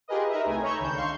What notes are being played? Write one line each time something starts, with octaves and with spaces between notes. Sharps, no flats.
F4 G4 G#4 A#4 B4 D#5
D#4 A#4 B4 D#5 E5
C2 A3 D#4 G#5
C#5 A#5 B5 C#6 E6 G6
C#2 D#3 D4 G6 E7
F5 C6 C#6 G6